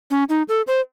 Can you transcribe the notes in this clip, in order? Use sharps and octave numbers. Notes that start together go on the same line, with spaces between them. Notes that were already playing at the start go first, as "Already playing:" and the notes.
C#4
D#4
A4
C5